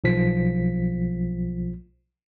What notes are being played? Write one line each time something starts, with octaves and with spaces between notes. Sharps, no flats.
B1 F3 B6